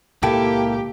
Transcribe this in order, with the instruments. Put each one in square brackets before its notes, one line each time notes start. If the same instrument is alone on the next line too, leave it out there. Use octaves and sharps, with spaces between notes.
[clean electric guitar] C#2 A#2 G5 [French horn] A#3 [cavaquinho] E4 A4 [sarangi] G4